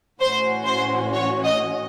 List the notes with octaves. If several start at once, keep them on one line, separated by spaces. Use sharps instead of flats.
A2 E3 A3 C#4 F#4 C5
C5
C#5
D#5